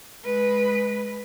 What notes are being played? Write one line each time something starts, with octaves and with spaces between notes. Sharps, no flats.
G#3 B4